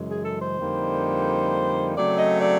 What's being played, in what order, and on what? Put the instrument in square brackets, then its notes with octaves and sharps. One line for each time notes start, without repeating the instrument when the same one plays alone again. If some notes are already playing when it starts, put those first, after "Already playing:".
Already playing: [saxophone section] F#2 C#3 E3 G#3
G#4
A4
C5
F2 D3 G3 A#3 D#4
C#3 F#3 A3 C4 D5
D#5
D5